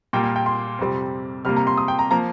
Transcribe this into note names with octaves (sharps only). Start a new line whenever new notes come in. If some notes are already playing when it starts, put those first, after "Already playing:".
A#2 G3 A#3 G5
G5
G5
C6
F2 C3 G3 C4
C3 G3 A#3 F6
A#5
C6
D#6
G5
A#5
F3 A#3 A#5